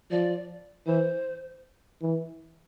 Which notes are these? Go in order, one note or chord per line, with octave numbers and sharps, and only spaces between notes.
F3 D5
E3 C5
E3